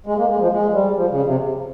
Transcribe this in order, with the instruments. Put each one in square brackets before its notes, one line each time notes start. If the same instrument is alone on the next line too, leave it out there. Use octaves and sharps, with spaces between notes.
[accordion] G#3
A#3
G#3
F3
G#3
G3
F3
C#3
C3